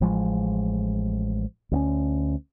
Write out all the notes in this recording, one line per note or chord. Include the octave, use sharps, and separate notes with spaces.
A1 F3 G#3
D2 B3 C#4